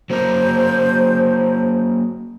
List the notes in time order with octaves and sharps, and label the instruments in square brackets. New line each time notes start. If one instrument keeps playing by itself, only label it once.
[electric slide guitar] F#3 A#3 A#4 [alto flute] C5